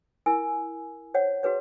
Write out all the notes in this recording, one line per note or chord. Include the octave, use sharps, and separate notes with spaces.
E4 A#4 G#5 E6
C5 C#5 F#5
F#4 G#4 B4 C#5